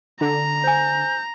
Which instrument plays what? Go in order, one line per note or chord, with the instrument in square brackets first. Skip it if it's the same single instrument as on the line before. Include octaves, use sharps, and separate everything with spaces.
[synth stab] D3 [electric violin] A#5
[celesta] C5 G#5 [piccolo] G6